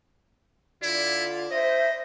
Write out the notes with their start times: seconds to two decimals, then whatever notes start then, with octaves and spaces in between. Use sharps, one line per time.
0.82 D3 E4 F4 D5
1.51 C5 D#5 E5